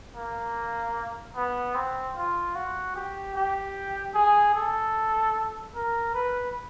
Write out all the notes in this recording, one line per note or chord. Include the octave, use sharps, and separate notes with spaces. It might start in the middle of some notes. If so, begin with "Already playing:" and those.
A#3
B3
C4
F4
F#4
G4
G4
G#4
A4
A#4
B4